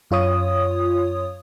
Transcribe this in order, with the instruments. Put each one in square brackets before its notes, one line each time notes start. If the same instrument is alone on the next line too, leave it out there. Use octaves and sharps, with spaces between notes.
[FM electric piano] F#2 F4 C#5 D#6